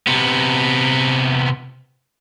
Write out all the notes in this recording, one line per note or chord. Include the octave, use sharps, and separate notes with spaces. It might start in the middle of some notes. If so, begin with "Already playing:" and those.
C3 B3